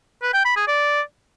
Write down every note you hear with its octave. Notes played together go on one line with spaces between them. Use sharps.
B4
G5
B5
G#4
D5